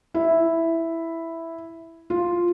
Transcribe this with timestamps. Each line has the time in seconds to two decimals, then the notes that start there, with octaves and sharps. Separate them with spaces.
0.14 E4
2.10 F4